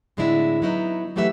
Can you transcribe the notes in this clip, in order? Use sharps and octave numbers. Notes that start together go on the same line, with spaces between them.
A2 D3 G#3 C4 D4 E4
F#3 B3 D#4 E4
E3 F#3 A3 G4 B4 E5